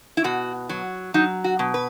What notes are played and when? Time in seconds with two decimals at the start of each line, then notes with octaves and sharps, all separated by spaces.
0.17 E4
0.24 B2 F#4
0.69 F#3
1.14 F#3 D#4
1.44 F#4
1.59 B2
1.74 B4